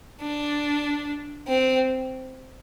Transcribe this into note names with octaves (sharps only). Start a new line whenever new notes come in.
D4
C4